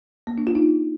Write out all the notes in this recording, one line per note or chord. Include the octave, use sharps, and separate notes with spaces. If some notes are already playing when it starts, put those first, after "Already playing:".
A#3
D4
F4
D#4